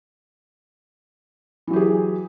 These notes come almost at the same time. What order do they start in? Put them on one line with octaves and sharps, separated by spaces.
E3 F#3 G4 G#4